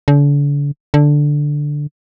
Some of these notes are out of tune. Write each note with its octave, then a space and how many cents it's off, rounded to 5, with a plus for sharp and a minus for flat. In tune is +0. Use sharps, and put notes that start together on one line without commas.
D3 -40
D3 +0